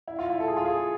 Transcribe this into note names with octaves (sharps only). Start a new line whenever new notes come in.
E4
F4
E4
A4
G#4
F4
G#4